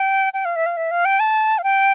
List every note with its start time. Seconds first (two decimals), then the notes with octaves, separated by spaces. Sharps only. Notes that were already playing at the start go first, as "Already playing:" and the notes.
Already playing: G5
0.34 G5
0.45 F5
0.56 E5
0.66 F5
0.77 E5
0.91 F5
1.05 G5
1.20 A5
1.58 F5
1.64 G5